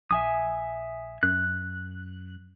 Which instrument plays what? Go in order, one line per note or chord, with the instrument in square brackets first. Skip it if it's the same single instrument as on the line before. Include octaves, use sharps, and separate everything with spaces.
[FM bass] A#1 [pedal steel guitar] E5 G#5 D#6
[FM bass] F#2 [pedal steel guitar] F#6